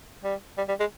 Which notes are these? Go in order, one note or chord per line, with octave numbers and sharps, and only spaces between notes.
G3
G3
G3
G#3